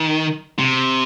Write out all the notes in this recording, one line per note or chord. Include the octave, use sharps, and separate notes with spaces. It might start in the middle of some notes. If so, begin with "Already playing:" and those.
Already playing: D#3
C3